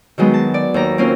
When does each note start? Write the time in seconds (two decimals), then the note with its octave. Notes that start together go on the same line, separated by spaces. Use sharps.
0.18 D#3 F#3 G#3 B3
0.34 A5
0.54 D5
0.74 D#2 A#5
0.98 A#3 C4 C#4 F4